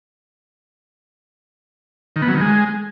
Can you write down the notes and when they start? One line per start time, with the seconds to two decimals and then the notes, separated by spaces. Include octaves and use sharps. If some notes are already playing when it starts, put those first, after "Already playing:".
2.16 D#3
2.22 B3
2.28 F#3
2.35 D#3
2.41 G#3